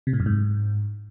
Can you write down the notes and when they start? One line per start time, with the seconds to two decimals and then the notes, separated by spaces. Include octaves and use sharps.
0.07 C3
0.13 A2
0.20 F#2
0.26 G#2